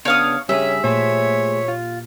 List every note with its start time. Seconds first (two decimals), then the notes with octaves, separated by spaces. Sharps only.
0.05 C#3 B3 D4 C#5 F5 D#6
0.49 G2 C#3 C#4 G4 G#4 E5
0.84 A#2 A3 G#4 C5 C#5
1.68 F4